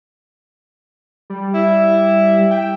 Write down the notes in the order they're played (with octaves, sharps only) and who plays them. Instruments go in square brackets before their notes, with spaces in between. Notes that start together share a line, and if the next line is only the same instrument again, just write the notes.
[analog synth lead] G3
[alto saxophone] E4
[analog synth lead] G5